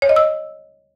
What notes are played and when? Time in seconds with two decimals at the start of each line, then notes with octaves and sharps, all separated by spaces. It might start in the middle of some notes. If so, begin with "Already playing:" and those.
0.02 C#5
0.09 D#5
0.16 E6